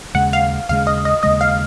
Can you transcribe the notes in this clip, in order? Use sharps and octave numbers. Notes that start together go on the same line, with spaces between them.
D#2 C#3 G#3 F#5
F5
D#2 C#3 G#3 F5
D#5
D#5
D#2 C#3 G#3 D#5
F5